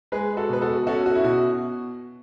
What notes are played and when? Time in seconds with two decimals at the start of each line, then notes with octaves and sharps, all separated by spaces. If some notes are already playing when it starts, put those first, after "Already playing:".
0.12 G#3 G#4 B4
0.37 F#4 A4
0.49 B2 B4
0.61 F#4 A4
0.87 C#4 F#4 A4
1.06 F#4
1.15 E4
1.24 B2 F#4